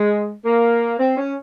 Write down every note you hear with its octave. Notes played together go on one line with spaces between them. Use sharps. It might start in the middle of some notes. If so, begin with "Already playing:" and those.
Already playing: G#3
A#3
C4
C#4